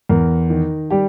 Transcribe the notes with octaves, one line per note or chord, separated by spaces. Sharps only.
E2 A#4
D#3
G3 G4